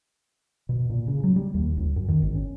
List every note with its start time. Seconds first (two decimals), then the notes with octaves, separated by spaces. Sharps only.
0.69 B2
0.90 A#2
1.07 C#3
1.23 F#3
1.36 G3
1.54 D#2
1.77 C#2
1.96 F#2
2.08 D#3
2.22 G#1
2.35 C#4